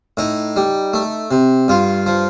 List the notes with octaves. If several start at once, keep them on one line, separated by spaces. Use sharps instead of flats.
A2 D#4
G3
A3
C3
G2 F4
F3